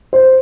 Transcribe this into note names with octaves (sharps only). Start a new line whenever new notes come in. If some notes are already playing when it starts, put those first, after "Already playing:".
C5